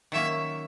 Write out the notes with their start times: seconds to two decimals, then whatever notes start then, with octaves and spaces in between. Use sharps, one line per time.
0.12 D#3 F#3 A#3 C#4 E5